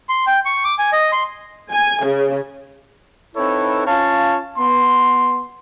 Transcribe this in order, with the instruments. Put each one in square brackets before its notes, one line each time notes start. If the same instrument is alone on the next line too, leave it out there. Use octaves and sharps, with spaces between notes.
[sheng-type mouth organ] C6
G5
C#6
D6
G#5
D#5
C6
[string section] G#5
C#3
[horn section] C4 D#4 E4 A4 B4 C#5
C#4 F4 C#5 F5 A5
B3 C6